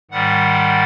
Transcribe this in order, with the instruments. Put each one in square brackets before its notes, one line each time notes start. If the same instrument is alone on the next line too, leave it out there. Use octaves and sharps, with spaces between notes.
[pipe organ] G#2 D#3 G3 F#5